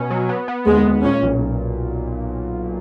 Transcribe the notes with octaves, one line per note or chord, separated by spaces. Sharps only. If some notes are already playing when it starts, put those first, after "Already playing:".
Already playing: B2 C#4
F#3
B3
B3
D#2 G#3
D#2
A#2 C#4
B1